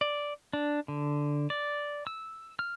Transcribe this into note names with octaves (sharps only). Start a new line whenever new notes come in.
D5
D4
D3
D5
E6
F6